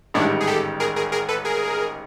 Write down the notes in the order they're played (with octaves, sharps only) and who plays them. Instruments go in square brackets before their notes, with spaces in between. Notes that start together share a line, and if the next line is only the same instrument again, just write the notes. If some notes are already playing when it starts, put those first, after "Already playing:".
[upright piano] A1 G#2 D#3 G3 [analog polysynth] D4 E4
[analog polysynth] G#4
G4 A4
G#4 A#4
G#4 A#4
G#4 A#4
A4 B4
G#4 A#4